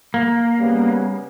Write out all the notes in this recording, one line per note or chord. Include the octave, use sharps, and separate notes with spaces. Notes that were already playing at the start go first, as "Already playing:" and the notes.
A#3
C#3 G3 B3